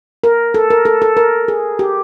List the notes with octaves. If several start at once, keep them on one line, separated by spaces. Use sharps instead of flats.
A#4
A4
A#4
A4
A4
A#4
G#4
G4